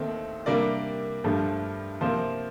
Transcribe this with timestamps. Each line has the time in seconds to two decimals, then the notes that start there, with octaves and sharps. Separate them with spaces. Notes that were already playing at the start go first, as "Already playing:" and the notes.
Already playing: D#2 D#3 A3 C4
0.46 C3 G3 A#3 D4 A#4 D5
1.24 G2 F3 A3 D4
2.01 C3 F3 A#3 C5